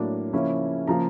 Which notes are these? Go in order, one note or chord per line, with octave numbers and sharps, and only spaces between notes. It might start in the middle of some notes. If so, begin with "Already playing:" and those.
Already playing: A2 F#3 A#3 D4
C#3 F3 A#3 C#4 E4
C#3 F3 A#3 A#5